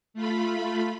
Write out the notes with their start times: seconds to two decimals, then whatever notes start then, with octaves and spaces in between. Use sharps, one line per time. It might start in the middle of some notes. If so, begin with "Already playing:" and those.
0.14 A3 F4 B5